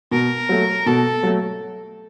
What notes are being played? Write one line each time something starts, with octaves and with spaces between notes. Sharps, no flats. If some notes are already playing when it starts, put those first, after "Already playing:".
B2 A#4
F#3 A3
B2 A4
F#3 A3